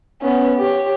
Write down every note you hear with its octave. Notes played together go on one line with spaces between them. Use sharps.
B3 C#4
G4 C#5